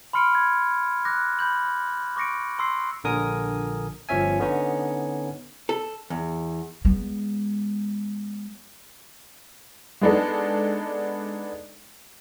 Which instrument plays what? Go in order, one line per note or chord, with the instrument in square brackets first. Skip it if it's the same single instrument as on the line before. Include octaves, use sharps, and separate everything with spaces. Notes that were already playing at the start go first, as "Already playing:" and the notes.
[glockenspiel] B5 C6 F6 C#7 D7
G#6
D6 F#6 A#6
B5 G6 F#7
C#6 D6 A#6 C#7 D7
C6 E6 C7
[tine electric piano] A#1 D3 A#4 G#5 D#6
G1 F3 C#4 E5 G#5
D3 B3 C#4 D#4
[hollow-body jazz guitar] A4
E2
[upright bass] G#3 B3
[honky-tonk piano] G#3 B3 D4 D#4 A4